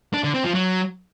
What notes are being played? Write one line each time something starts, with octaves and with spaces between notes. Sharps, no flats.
D4
D3
C4
F3
F#3